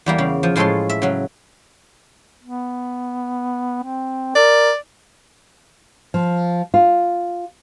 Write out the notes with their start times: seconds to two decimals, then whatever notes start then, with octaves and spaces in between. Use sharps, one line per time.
0.06 E2 G3 A#3
0.18 C#3
0.43 F3
0.56 A2 F3 G#3 A4 C#5 C6
0.89 E5
1.02 C#3 F#3
2.43 B3
3.83 C4
4.36 A#4 D5
6.14 F3
6.74 F4